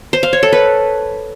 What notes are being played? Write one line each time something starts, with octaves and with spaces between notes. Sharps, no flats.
C5
F5
C#5
A4
B4